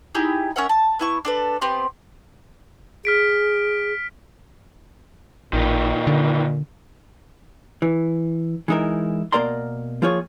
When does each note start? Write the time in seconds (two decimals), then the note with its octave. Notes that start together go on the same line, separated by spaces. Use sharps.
0.15 D#4 E4 G4 G#4
0.56 C#4 A#4 E5 F#5
0.69 A5
0.99 B3 E4 C#6
1.25 D4 A4 B4
1.61 B3 C4 G4 C6
3.05 G#4 F6 B6 D7
5.53 A1 A#2 D#3 E3
6.07 D3
7.82 E3
8.68 E3 G#3 D#4 E4 A#4
9.32 B2 A#3 A#4 D5 A#5 C6
10.02 F3 A#3 F4 G#4 C#5